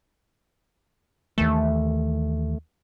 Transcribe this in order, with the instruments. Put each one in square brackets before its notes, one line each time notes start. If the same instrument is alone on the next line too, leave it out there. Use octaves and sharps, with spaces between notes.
[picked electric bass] D#2 D#3 E3 [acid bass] A3